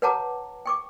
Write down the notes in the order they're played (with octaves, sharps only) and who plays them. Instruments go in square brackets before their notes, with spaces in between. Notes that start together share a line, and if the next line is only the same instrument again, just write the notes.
[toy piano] B4 C#5 F#5 A5 A#5 D6
G5 C#6 D6